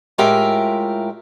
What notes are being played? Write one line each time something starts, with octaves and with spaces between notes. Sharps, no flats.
A2 G#3 F4 G4 A#4 E5